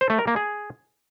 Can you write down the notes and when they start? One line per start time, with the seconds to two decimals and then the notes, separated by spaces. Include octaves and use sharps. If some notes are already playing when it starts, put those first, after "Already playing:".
0.01 C5
0.10 A3
0.19 A#4
0.27 A#3
0.36 G#4